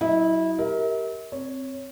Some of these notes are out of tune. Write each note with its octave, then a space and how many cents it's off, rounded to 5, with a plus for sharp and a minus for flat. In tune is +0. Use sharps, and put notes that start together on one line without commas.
F#3 +10 E4 -20 D#5 +15
G4 +0 A#4 +0 E5 -45
C4 +5 C#5 +0